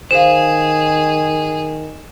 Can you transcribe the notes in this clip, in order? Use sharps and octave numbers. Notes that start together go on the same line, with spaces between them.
D#3 G#4 C5 F5 E7